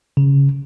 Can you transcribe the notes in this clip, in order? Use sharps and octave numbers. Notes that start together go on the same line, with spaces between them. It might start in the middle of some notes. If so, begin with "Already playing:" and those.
C#3